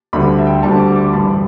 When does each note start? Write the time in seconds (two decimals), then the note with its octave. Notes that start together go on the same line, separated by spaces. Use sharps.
0.13 D2 D3 G3 B5
0.38 E5
0.47 G5
0.62 D2 D3 G3 A5
0.80 D6
0.95 D6
1.13 A1 G2 G3 B5